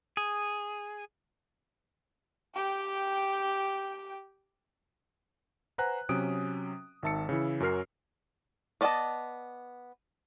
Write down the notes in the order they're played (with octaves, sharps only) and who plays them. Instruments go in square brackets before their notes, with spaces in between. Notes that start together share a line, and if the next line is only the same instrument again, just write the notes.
[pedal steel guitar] G#4
[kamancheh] G4 G5
[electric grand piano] B4 C5 F#5 G#5 A#5 F#6
C3 F#3 C#4 D#6 D7
G#1 D#3 E5 A5 E6 C#7
C#3 E3 E4
F#2 C#4 F#4 A#4 F6 C7
[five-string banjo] B3 D5 D#5 G#5 A5